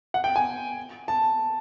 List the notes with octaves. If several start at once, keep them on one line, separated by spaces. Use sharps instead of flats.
F#5
G5
G#5
A5